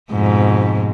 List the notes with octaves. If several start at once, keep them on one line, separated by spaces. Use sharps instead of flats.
F2 G#2 B2